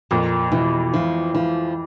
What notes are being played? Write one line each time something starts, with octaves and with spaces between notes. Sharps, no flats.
F2 A#2
B2 E3
E3 F3
E3 F3